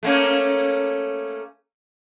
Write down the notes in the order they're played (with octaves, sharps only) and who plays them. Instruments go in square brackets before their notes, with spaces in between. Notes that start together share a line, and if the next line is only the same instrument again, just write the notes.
[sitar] A3 A#3 C#4